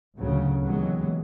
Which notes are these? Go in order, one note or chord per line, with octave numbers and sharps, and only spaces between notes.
D2 A#2 C#3 F#3
D#2 B2 E3 F#3 G#3